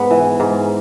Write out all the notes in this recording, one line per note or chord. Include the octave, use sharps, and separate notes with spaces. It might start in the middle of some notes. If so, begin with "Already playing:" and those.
Already playing: G#2 B3
E3
G#2